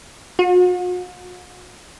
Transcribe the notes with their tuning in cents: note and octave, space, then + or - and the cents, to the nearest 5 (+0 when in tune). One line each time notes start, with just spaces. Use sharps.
F#4 -45